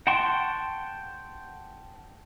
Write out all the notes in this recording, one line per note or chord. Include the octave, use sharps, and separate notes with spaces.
F#5 G5 A5 C6 C#6